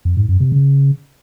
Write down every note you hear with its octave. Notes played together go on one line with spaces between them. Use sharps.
F2
G#2
F#2
C3
C#3